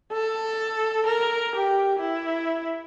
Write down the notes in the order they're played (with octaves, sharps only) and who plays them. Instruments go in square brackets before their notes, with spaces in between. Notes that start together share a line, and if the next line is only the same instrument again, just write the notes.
[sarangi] A4
A#4
G4
E4